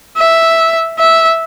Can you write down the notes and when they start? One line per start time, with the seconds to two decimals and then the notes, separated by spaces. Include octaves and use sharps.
0.17 E5
0.99 E5